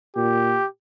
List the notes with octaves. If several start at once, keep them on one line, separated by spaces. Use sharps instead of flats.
A#2 G4